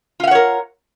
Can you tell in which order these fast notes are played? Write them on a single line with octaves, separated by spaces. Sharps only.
F4 F5 F#5 C#5 A#4